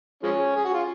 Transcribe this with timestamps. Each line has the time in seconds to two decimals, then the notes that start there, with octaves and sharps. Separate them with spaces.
0.23 F3 G#3 C#4
0.56 G#4
0.65 F#4
0.73 F4